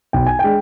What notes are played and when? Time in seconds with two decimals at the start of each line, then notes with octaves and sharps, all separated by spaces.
0.13 B1 G5
0.26 G#5
0.39 G#3 D4 G5